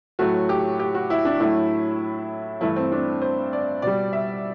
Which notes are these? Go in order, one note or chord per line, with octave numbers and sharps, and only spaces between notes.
A2 F#3 A3 F#4
G4
G4
F#4
E4
D4
A2 F#3 A3 E4
G2 E3 A3 E4
C4
D4
C5
D5
B2 G3 D5
E5